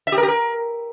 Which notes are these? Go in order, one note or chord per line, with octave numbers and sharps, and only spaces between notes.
E5
G4
A#4
G4
A#4